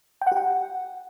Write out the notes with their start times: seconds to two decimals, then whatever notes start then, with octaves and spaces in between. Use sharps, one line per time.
0.22 G5
0.27 F#5
0.32 G4
0.37 F#5